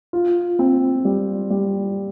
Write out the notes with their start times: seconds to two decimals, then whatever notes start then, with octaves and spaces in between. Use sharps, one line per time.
0.13 F4
0.59 C4
1.05 G3
1.50 G3